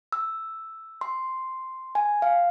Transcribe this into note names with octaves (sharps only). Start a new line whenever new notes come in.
E6
C6
G#5
F5